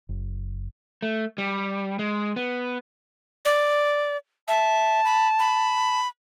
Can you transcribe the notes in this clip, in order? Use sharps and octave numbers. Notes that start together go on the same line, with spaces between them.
F#1
A3
G3
G#3
B3
D5
E5 A5
B5
B5